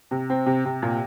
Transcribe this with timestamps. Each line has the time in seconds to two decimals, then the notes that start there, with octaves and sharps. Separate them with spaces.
0.11 C3
0.30 C4
0.46 C3
0.65 C3
0.82 A#2